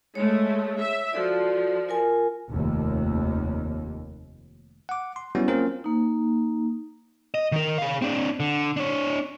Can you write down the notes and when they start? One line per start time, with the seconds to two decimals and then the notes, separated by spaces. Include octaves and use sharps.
0.15 G#3 A3 C#5
0.81 E5
1.13 F3 F#4 A4 D5
1.89 F4 A#4 G#5
2.50 F1 D#2
4.89 F#5 D6
5.16 C6
5.35 F#3 G3 B3 C#4 E4 F#4
5.48 A#3 C4 C#4 F4 A#4 C5
5.84 A#3 D#4
7.34 D#5
7.52 D#3 A#4
7.78 G#4 F5
8.02 C4 D4
8.40 D3
8.77 D4 C#5